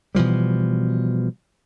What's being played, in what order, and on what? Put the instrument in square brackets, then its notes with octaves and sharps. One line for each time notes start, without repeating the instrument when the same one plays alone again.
[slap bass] B2 E3 F3 G3